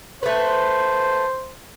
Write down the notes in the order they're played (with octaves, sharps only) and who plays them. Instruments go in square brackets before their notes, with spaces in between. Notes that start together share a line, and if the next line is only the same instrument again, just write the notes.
[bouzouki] A3 B4 [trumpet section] C5